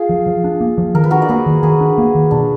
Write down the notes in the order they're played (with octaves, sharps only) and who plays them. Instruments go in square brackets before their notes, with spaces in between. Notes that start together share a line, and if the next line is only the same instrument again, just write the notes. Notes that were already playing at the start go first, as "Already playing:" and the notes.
Already playing: [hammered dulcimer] F4 G#4
[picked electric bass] F3
F3
D4
A#3
F3
[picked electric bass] D#3 [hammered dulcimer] A#4
[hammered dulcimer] B4
[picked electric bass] D4 [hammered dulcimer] F#4 A#4
[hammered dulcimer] D5
[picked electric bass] A#3 [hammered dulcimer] G#4 B4
[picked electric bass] D#3
[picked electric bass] D#3 [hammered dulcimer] G#4 B4
[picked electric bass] D4
A#3
D#3
[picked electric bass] B2 [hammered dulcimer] D4